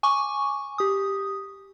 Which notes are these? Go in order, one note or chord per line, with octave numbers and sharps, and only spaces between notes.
G#5 C#6 D6
G4 D#6